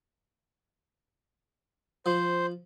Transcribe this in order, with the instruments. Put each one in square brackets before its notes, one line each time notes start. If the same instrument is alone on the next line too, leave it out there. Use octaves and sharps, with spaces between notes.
[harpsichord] F3 [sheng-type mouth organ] C5